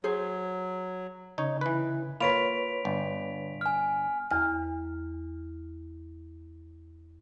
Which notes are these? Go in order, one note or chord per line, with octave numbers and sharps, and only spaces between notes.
F#3 G#4 C5
C#3 D#4 C#5
E3 B4
A#3 F4 B4 C#5 B5 B6 D7 F7
G1
G#5 F6
E2 F6